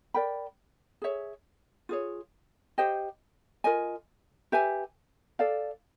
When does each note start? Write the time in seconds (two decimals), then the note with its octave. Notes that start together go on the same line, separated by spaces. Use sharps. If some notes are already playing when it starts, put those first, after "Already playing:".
0.14 A#4 D5 G5 B5
1.02 G#4 C#5 E5
1.89 F4 G#4 C#5
2.78 G4 C5 D#5 G5
3.64 F4 A#4 D#5 G#5
4.52 G4 B4 E5 G#5
5.39 A4 D5 F5